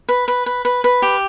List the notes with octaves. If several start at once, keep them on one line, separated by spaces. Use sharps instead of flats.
B4
B4
B4
B4
B4
G4